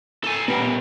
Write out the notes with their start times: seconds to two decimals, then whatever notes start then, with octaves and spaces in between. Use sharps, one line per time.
0.24 A4 G#5
0.48 A#2 G3 B3